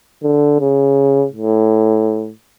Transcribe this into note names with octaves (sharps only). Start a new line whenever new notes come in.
D3
C#3
A2